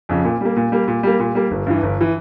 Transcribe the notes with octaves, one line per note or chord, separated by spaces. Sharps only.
F2 C#3
A#2
G3 A#3
A#2
G3 A#3
A#2
G3 A#3
A#2
G3 A#3
G1
G2 E3
G1
E3